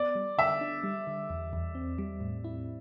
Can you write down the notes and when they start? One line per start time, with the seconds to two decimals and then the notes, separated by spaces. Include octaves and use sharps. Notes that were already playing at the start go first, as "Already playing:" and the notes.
Already playing: B3 D5
0.15 G3
0.38 D3 E5
0.61 D4
0.83 G3
1.07 D3
1.30 E2
1.53 E2
1.75 C4
1.98 G3
2.21 A2
2.44 E4